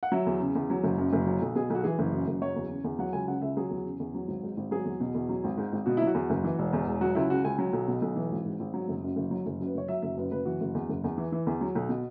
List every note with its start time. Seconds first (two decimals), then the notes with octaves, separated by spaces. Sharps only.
0.03 F#5
0.12 F#3 E5
0.26 E2
0.40 C#3
0.55 E2
0.70 F#3
0.84 F#1
0.98 F#2
1.13 F#1
1.27 F#3
1.42 B1
1.55 B2 G#4
1.70 B1 F#4
1.84 E3 G#4
1.99 F#1
2.13 F#2
2.28 F#1
2.42 F#3 C#5
2.56 E2
2.71 C#3
2.84 E2
2.99 F#3 F#5
3.13 C#2 G#5
3.28 C#3 F#5
3.42 C#2 E5
3.57 F#3 G#4
3.70 E2
3.85 C#3
4.00 E2
4.14 F#3
4.28 G#1
4.43 G#2
4.57 G#1
4.71 F#3 G#4
4.85 E2
5.00 B2
5.15 E2
5.29 F#3
5.44 G#1
5.57 G#2
5.72 G#1
5.86 B2 F#4
5.97 F#3 E4
6.07 F#4
6.14 E2
6.30 F#1
6.44 E3
6.58 E1
6.73 E2
6.87 E1
7.01 F#3 F#4
7.15 C#2 E4
7.30 C#3 F#4
7.44 C#2 G#5
7.59 F#3
7.73 B1
7.88 B2
8.02 B1
8.16 E3
8.31 G#1
8.45 G#2
8.60 G#1
8.74 F#3
8.89 F#1
9.02 F#2
9.16 F#1
9.31 F#3
9.46 F#1
9.60 F#2
9.66 B4
9.75 F#1 C#5
9.88 F#3 E5
10.02 F#1 E5
10.17 F#2 B4
10.31 F#1 B4
10.45 E3 F#4
10.61 F#1
10.75 E2
10.89 F#1
11.04 E2
11.18 E3
11.32 E3
11.47 E2
11.61 F#3
11.75 B1
11.89 B2